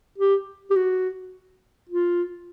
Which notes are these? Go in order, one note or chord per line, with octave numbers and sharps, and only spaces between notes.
G4
G4
F#4
F4